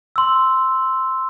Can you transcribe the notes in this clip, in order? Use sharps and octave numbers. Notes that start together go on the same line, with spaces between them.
C6 E6